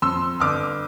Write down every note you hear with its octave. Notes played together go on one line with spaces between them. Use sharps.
F2 C6 E6
G1 D6 F6